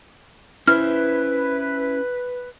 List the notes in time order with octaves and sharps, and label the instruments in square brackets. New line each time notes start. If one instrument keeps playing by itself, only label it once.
[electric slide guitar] C#4 C5 E5 [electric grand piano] E4 [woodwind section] B4 [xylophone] F6